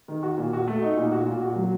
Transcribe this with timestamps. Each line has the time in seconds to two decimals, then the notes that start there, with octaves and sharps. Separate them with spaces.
0.08 D#3
0.23 F#4
0.38 A#2
0.53 F#4
0.68 A3
0.82 D#4
0.97 A#2
1.12 F#4
1.26 A#2
1.42 F#4
1.56 F#3